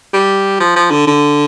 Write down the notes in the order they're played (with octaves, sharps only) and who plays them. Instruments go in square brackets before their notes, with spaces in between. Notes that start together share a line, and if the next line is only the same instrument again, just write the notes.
[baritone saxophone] G3
F3
F3
D3
D3